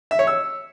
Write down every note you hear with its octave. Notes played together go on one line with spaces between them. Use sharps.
E5
C#5
E6